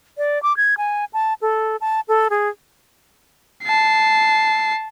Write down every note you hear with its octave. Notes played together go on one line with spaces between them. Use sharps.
D5
D6
G#6
G#5
A5
A4
A5
A4
G#4
A5 C7